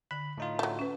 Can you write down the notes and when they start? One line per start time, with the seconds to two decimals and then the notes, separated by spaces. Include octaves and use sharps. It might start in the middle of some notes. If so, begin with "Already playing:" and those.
0.11 D3 B5
0.38 A2 D#4 F4
0.59 F#3 A3
0.79 C#4 B4